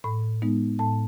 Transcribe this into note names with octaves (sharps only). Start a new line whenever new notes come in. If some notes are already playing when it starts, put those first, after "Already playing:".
A2 B5
G#3 B3 D#4
A2 A5